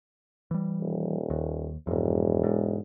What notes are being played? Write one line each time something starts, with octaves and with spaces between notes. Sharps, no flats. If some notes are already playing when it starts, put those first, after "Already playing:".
E3 G3
D#1
D#2
E1 F2 G#2
G#2